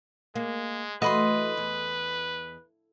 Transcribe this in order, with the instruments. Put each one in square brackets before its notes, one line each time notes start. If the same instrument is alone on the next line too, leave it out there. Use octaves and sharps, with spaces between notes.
[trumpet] G#3 [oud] A#3
[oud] E3 A3 F#4 [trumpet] B4 [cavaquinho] D#5 B5 C6
[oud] E2